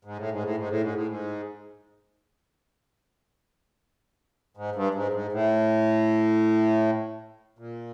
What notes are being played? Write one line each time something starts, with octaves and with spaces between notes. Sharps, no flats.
G#2
A2
G#2
A2
G#2
A2
G#2
A2
G#2
G#2
G2
G#2
G#2
A2
A#2